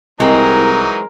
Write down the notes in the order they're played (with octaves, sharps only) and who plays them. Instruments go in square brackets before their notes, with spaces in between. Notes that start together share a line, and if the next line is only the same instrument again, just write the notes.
[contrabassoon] C2 [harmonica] E3 F#3 D#4 [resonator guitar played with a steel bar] G#3 C4 [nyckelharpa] A#4